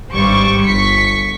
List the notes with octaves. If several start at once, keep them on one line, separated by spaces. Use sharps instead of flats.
G#1 G2 G3 C5 C#6 D6
G1 C#6 B6 C#7